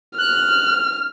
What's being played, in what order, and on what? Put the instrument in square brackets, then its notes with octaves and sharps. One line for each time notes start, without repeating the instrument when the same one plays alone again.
[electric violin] F6 [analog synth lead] F#6